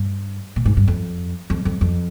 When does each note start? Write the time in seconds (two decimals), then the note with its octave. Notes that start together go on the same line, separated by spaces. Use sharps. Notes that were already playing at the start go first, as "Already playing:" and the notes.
Already playing: G2
0.56 A#2
0.65 G#2
0.77 G2
0.88 F2
1.50 F2
1.65 F2
1.81 F2